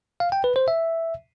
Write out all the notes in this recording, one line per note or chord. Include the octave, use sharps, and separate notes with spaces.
F5
G5
B4
C5
E5